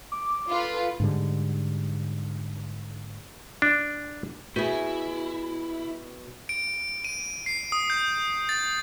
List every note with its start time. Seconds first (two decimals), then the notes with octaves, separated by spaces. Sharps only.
0.12 D6
0.49 F4 A4 B4
1.00 G#2 D3 G3
3.62 D4
4.56 B2 E4 F#4 G#4
6.49 D7
7.04 D#7
7.46 C7
7.72 D#6
7.90 G6
8.49 A6